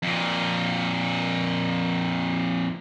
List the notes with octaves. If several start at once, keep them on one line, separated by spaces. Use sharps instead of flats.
F2 A#2